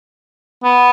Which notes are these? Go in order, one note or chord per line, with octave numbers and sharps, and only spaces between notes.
B3